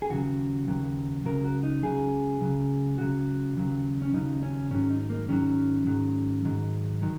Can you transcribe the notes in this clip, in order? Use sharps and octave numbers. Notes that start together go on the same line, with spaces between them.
G#4
D#2 C#3 F#3 F#4
D#2 C#3 F#3
C#2 C#3 F#3 A#4
F#4
D#4
C#2 C#3 F#3 G#4
C#2 C#3 F#3
C#2 C#3 F#3 F#4
D#2 C#3 F#3
C#4
D#2 C#3 F#3 D#4
C#4
G#2 D#3 F#3 C#4
D#4
A#3
G#2 D#3 F#3 C#4
G#2 D#3 F#3
G#2 D#3 F#3
D#3 F#3